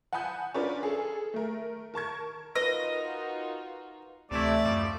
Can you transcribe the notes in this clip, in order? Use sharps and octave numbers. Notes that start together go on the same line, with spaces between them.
F#5 G#5 A5 B5 D#6 G6
C#4 D4 F4 A#4 B4 D5
G#4 A4
A3 A#4
A#4 A5 C#6 G#6
D#4 F4 F#4 A#4 B4 D#5
D2 C3 E3 A3 E4 D5
F#2 F3 G3